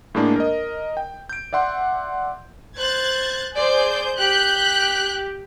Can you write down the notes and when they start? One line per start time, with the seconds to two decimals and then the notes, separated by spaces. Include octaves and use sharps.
0.15 A2 G#3 A#3 D4
0.36 A#4 D#5
0.97 G5
1.29 G6 D7
1.53 D5 E5 F#5 C6
2.77 C5 F#6 G#6 A6
3.56 G#4 C5 D5 G6
4.19 G4 F#6 G6 B6